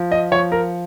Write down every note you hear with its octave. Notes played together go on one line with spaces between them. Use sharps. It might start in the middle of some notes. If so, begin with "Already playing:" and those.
Already playing: F3
D#5
F3 C#5
A#4